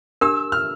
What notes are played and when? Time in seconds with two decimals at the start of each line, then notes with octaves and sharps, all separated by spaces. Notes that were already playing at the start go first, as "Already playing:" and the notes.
0.21 D4 G4 A#4 E6
0.52 F6